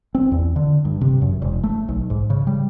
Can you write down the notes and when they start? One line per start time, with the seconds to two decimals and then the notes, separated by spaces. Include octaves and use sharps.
0.15 C4
0.32 E2
0.56 D3
0.85 G2
1.01 C3
1.22 F#2
1.42 E1
1.63 A3
1.89 B1
2.10 G#2
2.30 C#3
2.47 G3